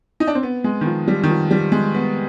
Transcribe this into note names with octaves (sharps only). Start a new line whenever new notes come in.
D#4
D4
C4
B3
G#3
D#3
F3
G3
D#3
F3
G3
G#3
B3